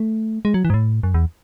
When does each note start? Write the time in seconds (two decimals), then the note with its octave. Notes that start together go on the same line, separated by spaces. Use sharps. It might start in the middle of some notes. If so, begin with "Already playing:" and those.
Already playing: A3
0.45 G#3
0.54 F#3
0.65 E3
0.70 G#2
0.74 A2
1.03 F#2
1.14 E2